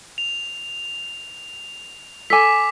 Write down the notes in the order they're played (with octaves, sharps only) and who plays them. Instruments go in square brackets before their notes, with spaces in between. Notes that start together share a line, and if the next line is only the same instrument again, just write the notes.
[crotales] F7
[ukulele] A4 G#5 [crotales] D6 B6